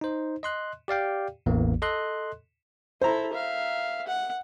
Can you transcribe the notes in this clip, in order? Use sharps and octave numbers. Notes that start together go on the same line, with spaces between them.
D#4 C5
D#5 C6 F#6
G4 D5 F5 G5
A1 E2 E3 A#3
A4 D#5 C6 F#6
E4 A4 C5 A#5
E5 F5
F#5